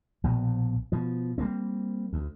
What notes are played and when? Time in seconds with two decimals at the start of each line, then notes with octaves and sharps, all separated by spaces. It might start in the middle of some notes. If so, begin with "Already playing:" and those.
0.24 A#1 B2
0.92 B2 F3
1.38 G3 A3 A#3 C4
2.13 D2